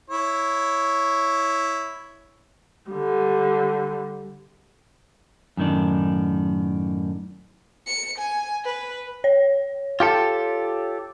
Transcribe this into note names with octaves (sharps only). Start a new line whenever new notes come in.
E4 C#5
D3 G3
F#2 A2 D#3 D4
C#7
G#5
B4
C#5
F4 G4 A4